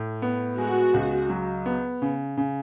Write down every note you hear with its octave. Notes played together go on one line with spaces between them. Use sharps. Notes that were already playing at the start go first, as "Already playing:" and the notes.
Already playing: A2
B3
G#3 F#4
C#2
F#3
B3
C#3
C#3